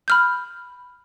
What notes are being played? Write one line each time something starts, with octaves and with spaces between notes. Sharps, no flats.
B5 F6 G6